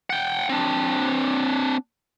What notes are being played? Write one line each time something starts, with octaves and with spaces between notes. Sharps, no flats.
F#5 G5
C4 D4